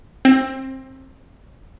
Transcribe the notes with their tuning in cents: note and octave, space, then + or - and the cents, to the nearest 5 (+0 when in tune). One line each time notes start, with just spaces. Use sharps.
C4 +20